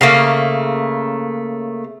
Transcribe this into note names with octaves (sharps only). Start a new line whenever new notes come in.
C#3 A3 A#3